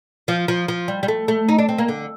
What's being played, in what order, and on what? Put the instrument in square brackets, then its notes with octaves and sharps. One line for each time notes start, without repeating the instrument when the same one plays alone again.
[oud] F3
F3
F3
G3
G3
A3
A3
D#4
D4
C4
A#3
D3